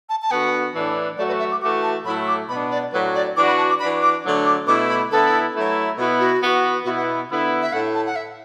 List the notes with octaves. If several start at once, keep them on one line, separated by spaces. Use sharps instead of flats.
A5
A5
D3 B3 F#4 F#5
A2 E3 D4
F#3 A3 F#4 D5
B4
E5
D6
E3 A3 F#4 D6
A5
A2 F#3 A3 E4 B5
D6
B2 B3 D4 B5
D5
A2 F#3 D4 F#4 B4
D5
E3 D4 F#4 D6
B5
A5
D6
E3 D4 F#4 B5
D6
D3 F#3 A3 D4
D6
B2 A3 E4 D6
B5
D3 B3 E4 A4
F#3 A3 E4
B2 B3 E4 F#4
F#4
E3 B3 F#4
B2 B3 E4 F#4
F#5
D3 B3 E4
E5
A2 A3 E4 F#5
A5
F#5
E5